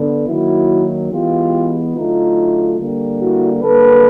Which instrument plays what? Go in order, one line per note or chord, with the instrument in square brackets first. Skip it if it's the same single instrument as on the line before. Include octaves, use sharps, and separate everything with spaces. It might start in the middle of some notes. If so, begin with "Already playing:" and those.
Already playing: [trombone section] D3 B3
D#3 F#3 A#3 E4 F#4
E3 G#3 B3 F4 G4
D3 F#3 A3 D#4 F4
D3 G3 A#3
E4 F#4
D3 G3 A#3 A4 B4